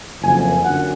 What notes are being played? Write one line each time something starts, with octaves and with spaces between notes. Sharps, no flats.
F#1 F2 F3 G#5
F#2 D3 F#5